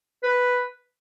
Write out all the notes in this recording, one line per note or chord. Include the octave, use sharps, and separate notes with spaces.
B4